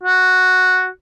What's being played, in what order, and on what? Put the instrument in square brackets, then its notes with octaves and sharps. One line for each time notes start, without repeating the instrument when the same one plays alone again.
[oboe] F#4